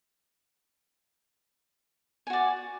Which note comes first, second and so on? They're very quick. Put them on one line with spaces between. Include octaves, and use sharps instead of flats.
G#5 F#4 D5